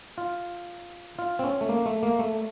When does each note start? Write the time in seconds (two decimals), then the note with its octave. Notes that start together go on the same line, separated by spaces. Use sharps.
0.18 F4
1.19 F4
1.39 C4
1.44 C#4
1.61 A3
1.69 A#3
1.86 A3
2.03 A#3
2.19 A3